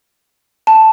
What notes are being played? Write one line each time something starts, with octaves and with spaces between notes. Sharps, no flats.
A5